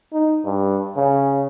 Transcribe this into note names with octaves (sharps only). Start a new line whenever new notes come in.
D#4
G2
C#3